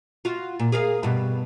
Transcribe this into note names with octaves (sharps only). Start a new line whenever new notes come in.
F4 F#4
A#2
G#4 A#4 F5
G2 B2